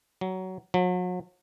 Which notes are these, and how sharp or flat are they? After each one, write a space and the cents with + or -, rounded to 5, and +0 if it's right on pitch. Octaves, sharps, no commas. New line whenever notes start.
F#3 +15
F#3 -40